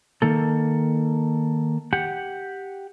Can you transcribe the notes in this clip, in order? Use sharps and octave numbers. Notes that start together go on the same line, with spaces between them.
D#3 A#3 A4
G4 F#5